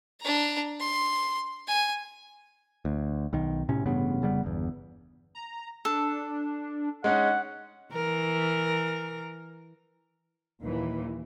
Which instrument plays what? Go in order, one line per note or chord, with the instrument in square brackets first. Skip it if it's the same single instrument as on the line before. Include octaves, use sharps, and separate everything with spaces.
[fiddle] D4 A#5
C6
G#5
[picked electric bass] D2
B1 D#3
A2 C3 C#4
A1 G2 C#3 B3
F1 C#3 G3 B3
G1 E2
[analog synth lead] A#5
[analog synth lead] D4 [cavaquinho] A4
[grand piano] G#3 C#4 D#4 [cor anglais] F#5
[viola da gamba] E3 A#4
[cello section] D#2 A#2 E3